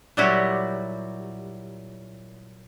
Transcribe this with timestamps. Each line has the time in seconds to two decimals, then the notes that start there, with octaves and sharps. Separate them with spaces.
0.17 A#2 F#3 G3 E4 F#4 G4